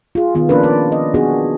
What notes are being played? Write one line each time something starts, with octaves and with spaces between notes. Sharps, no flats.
F4 G#4
D#3 B3 F4
F3 A#3 C#4 D4 A#4 B4
D5
D#5
B3 D4 F#4 G#4